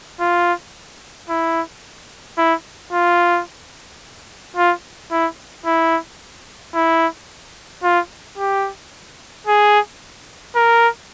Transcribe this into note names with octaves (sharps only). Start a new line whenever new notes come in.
F4
E4
E4
F4
F4
E4
E4
E4
F4
G4
G#4
A#4